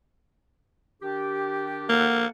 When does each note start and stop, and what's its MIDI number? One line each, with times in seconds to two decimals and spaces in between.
1.02 1.89 51
1.02 1.89 62
1.02 1.89 67
1.89 2.26 58
1.89 2.25 69
1.89 2.25 78